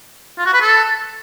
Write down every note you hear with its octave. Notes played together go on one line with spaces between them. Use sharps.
F4
F#4
B4
A4